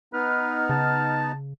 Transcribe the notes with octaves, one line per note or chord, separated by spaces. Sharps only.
B3 D#4 B4 F6
C#3 A5